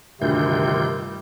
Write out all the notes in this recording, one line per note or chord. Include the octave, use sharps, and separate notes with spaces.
D2 G2 C3 D#3 G3 F4 G6